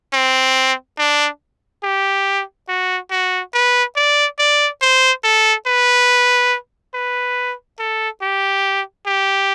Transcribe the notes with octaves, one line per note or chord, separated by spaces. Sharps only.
C4
D4
G4
F#4
F#4
B4
D5
D5
C5
A4
B4
B4
A4
G4
G4